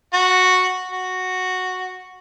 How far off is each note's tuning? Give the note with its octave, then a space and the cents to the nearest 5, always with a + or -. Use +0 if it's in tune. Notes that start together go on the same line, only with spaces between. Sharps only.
F#4 -5
F#4 -5